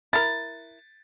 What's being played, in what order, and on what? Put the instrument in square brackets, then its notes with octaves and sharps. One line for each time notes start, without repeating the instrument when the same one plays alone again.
[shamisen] E4 A#4 [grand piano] A6